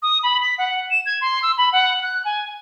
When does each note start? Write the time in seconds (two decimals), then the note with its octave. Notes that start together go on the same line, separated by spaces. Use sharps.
0.02 D#6
0.23 B5
0.42 B6
0.58 F#5
0.91 E7
1.06 G#6
1.21 C6
1.42 E6
1.58 B5
1.72 F#5
2.03 F#6
2.25 G#5